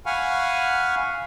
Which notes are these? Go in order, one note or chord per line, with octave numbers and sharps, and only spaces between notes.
F5 F#5 G#5 B5 C#6 F6